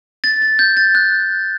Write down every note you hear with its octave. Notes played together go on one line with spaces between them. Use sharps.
A6
A6
G6
A6
F#6